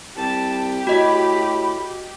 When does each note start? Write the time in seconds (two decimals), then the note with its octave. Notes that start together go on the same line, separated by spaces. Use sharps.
0.17 C2 G4 A5
0.87 A2 F#4 D#5 B5